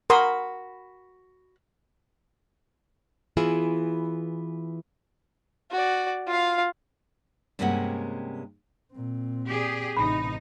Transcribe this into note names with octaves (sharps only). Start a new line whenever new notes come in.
F#4 A#4 B5 C6 D#6
E3 B3 E4 F4 G#4
F#4 D5
F4 F5
G2 C3 G#3 A#3 C#4 F#5
A#2 C4
G4 G#4 D5
A1 C3 D#4 B5